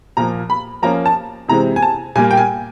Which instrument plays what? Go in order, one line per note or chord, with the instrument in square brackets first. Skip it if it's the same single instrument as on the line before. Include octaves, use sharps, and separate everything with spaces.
[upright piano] A#2 F3 A#3 A#5
B5
F3 A#3 C#4 A#5
A5
C3 E3 G#3 C4 A#5
G#5
A5
A#2 G3 A#3 G#5
G5
G#5